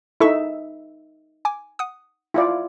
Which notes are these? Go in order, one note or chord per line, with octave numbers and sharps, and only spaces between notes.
D#4 E4 A4 E5 C#6
G#5 D6
F#5 D#6
E4 F4 D5